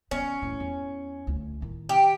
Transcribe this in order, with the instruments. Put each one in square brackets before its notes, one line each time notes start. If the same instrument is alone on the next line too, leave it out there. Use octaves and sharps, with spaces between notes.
[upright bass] D#3 B3 [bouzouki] C#4
[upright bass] A1
E2
D2 F4
A2 D#3
[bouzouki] G4